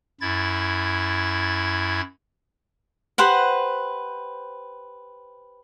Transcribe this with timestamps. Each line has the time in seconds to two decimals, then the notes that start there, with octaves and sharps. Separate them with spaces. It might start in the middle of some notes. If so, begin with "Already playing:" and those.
0.21 F#2 E4 G#6 A6
3.18 G4 B4 C5 F#5